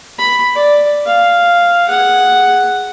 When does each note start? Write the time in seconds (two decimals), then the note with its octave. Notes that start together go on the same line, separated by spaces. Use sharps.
0.19 B5
0.55 D5
1.06 F5
1.88 G#4 F#5